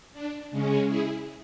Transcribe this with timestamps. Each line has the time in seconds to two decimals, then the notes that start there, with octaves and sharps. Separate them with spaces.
0.13 D4
0.51 C#3 G#3 C#4
0.88 E4 G#4